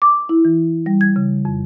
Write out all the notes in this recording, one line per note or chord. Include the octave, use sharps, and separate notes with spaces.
D6
E4
E3
G3
G#6
C#3
F2